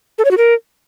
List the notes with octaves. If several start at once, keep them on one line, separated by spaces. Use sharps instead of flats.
A4
C#5
F#4
A#4